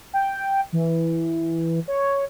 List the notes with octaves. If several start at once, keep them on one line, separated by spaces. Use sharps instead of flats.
G5
E3
C#5